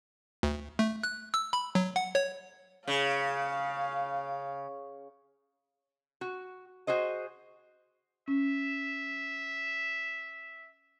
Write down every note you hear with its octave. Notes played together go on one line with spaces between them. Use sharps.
D2
A3
F#6
E6
B5
F#3
F#5
C#5
C#3 F5
F#4
F#4 G#4 C5 D#5
C#4 E5